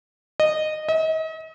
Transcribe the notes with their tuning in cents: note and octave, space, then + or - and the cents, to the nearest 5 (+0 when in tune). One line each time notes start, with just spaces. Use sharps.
D#5 -15
D#5 +40